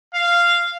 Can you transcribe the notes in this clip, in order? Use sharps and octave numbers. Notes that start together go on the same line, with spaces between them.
F5